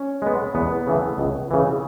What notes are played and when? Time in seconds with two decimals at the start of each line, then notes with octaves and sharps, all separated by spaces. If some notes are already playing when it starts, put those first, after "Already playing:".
Already playing: C#4
0.22 G#3 B3
0.55 E2 B3
0.87 C#3 E3 A3
1.18 C#2
1.51 C#3 E3